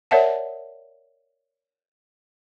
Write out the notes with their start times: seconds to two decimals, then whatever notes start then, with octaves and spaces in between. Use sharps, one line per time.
0.11 A#4 C#5 D5 E5 F#5 A5